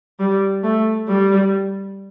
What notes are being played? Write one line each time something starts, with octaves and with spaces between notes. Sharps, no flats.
G3
A3
G3